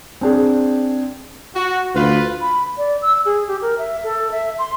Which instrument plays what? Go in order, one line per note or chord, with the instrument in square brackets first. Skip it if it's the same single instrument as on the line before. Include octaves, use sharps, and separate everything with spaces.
[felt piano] C4 D4 G#4
[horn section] F#4
[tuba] D2 [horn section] F4 B4
[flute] B5
D5
E6
G#4
G4
A#4
E5
A4
E5
C6